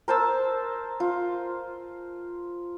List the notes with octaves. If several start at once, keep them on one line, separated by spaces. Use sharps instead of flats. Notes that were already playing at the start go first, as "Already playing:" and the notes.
A#4 C5 A5 E6
F4